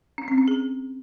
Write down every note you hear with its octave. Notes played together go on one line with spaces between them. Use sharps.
C#4
C4
C#4
G#4